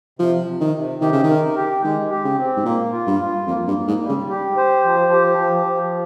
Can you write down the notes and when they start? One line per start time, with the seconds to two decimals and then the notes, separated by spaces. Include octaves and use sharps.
0.19 C3 F3
0.47 C3
0.61 D#3
0.74 C3
1.01 D#3 G4
1.12 C#3
1.23 D#3
1.29 A#4
1.56 G4
1.84 D#3 G#3
2.10 G4
2.25 C#3
2.38 C4
2.57 G#2
2.65 A#2 A#3
2.92 F4
3.07 G2
3.20 F4
3.47 F2 A#3
3.68 G2
3.75 A#3
3.88 G#2
4.02 G3
4.09 C#3
4.29 G4
4.57 C5
4.83 F3
5.12 G4
5.38 F3
5.66 F3